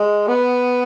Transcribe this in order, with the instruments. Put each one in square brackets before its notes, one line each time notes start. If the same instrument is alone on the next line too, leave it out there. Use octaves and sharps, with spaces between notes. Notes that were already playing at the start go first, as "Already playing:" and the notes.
Already playing: [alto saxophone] G#3
B3